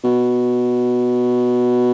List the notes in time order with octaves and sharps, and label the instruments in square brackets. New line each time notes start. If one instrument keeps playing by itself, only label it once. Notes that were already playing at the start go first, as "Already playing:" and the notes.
[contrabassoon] B2